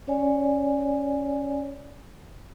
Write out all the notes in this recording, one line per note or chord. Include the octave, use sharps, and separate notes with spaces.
C#4 C#5 D5 G#5